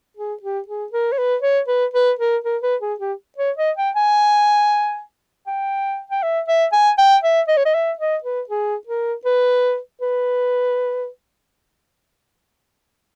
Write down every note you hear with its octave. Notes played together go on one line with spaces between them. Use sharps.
G#4
G4
G#4
A#4
C#5
B4
C#5
B4
B4
A#4
A#4
B4
G#4
G4
C#5
D#5
G5
G#5
G5
G5
E5
E5
G#5
G5
E5
D#5
C#5
D#5
E5
D#5
B4
G#4
A#4
B4
B4